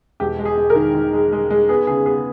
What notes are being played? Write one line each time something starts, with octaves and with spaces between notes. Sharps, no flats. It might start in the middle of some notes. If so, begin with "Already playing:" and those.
E1 G4
G#3
G#4
G#3
A#4
D#3
D#3
G#3
G#3
G#3
B3 G#4
C#3 G#4
B3 G#4